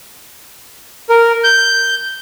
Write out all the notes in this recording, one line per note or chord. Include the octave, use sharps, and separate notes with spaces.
A#4
G6